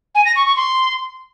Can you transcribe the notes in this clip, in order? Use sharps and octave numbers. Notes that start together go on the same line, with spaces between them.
G#5
A#6
C#6
C#6
C6